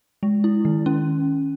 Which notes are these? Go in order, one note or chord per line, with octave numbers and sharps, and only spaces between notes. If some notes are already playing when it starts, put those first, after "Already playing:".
G#3
E4
D#3
C#4